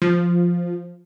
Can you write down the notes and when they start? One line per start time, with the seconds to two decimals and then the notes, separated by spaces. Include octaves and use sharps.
0.02 F3